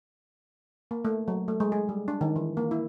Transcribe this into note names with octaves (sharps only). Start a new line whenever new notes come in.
A#3
A3
F#3
A3
G#3
G#4
G3
D4
D#3
E3
A#3
E4